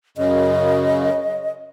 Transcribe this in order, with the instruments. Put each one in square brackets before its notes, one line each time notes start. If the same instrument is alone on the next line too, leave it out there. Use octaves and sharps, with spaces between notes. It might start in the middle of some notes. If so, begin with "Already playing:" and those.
[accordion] F#2 C#3 [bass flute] D#5